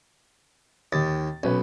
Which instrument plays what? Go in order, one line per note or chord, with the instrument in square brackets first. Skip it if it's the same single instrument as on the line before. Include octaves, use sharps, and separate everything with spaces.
[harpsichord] D#2 [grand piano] D#3 A6
[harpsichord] B1 [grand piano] C#4 B4